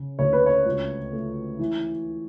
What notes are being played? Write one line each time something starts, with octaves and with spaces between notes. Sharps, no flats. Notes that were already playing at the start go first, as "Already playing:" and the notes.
Already playing: C#3
D2 C#5
B4
C#5
C#2
A3
E3